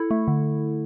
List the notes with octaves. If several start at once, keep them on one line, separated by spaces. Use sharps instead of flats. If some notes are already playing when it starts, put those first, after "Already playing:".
Already playing: E4 A4
A3
D3